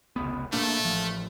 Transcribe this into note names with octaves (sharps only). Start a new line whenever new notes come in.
F1 C#2 B3
A#2 A3 A#3 D4
A1 F3